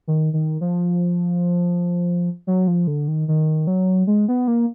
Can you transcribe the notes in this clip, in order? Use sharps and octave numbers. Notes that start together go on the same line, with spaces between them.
D#3
D#3
F3
F#3
F3
D3
D#3
D#3
F#3
G#3
B3
A#3